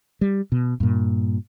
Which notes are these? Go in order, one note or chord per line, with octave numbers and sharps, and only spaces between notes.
G3
B2
G2 A#2